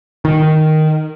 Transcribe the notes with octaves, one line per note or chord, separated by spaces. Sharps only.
D#3